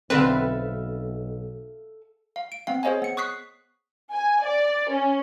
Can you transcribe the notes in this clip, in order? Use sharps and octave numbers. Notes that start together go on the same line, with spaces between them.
B1 D3 C4 A4 B4 E5 F5
F5
D7
B3 C4 F5
G#4 C5 C#5 D#5 F5 G#5
B3 C#7
C#6 D#6 F#6 B6 C7
G#5
D5
C#4